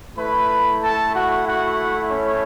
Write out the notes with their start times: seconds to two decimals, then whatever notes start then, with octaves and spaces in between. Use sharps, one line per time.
0.18 A3 E4 B4 B5
0.83 A4 A5
1.14 F#4 F#5
1.47 F#4 F#5
2.10 C#4 C#5